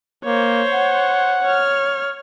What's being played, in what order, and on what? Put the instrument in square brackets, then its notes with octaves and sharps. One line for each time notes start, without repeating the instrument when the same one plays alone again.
[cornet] A#3 [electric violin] C5 C#5
[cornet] F#5
[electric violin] C#5 F6